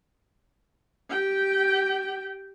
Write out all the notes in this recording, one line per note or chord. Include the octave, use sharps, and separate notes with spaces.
G4 G5